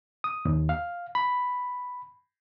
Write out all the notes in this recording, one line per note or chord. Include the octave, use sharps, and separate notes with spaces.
D#6
D#2
F5
B5